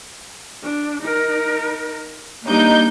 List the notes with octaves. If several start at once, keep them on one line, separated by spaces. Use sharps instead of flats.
D4
D#4 A#4
G3 A#3 D4 D#4 G6